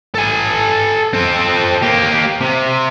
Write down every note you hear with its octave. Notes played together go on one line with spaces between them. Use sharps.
A4 G#5
C4 A4
A#3 G4
C3